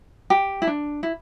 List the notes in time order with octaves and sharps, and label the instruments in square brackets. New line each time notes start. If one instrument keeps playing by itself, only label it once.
[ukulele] G4
E4
D4
E4